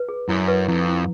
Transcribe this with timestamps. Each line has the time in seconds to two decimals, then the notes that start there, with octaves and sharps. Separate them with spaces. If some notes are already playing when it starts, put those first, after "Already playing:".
Already playing: B4
0.09 G#4
0.29 F#2 E4
0.48 B4
0.68 F2 E4
0.88 E4